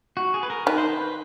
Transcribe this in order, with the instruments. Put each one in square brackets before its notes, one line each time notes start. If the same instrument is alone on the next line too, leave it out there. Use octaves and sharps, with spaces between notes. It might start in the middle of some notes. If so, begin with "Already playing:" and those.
[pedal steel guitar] F#4
G#4
B4
A#4
[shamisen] D#3 [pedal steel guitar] B4
[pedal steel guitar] C5
B4